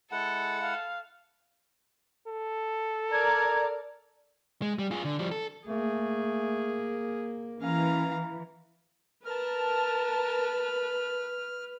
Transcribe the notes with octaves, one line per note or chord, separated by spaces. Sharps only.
G#3 E4 A4 F#5
F5
A4
A#4 D5 G#6
G#3
G3
F4 G#4
D3
F3 G3
A4
A3 A#3 G#4
E3 C#4 F5 A#5
A#4 B4 A5 F6